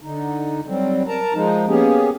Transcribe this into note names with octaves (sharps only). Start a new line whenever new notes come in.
D3 D#4
F#3 G3 C4
A#4 A5 A#5
F3 G#3 D#4
A#3 B3 C#4 G4 G#4